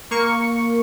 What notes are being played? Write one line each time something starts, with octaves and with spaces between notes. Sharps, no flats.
A#3 C#6